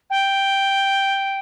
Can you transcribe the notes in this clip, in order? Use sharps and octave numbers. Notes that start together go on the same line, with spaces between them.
G5